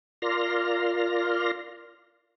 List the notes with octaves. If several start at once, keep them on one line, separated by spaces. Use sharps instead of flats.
F4 A#4 D5 C6 F6 A#6